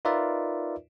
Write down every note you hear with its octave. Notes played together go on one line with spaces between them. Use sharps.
D#4 F4 A#4 B4 D5 E5